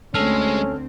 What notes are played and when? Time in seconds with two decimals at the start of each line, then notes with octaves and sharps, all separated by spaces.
0.14 D2 G#3 C4 C#4 A4 F6